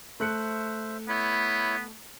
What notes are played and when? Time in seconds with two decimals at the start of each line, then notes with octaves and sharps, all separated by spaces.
0.20 A3 C5 E5 F#6 C#7
1.08 B3 E4 C#5 B5